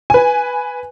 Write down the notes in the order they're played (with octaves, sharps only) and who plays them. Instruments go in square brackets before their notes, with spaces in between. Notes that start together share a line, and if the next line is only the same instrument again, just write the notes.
[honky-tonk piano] B4 G#5